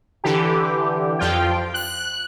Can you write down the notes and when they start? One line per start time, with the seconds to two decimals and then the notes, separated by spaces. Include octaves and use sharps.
0.24 D3 E3 G4
1.19 F2 F3 F4 G5
1.74 F#6